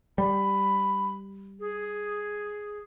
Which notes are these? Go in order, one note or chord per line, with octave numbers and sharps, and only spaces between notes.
G3 B5
G#4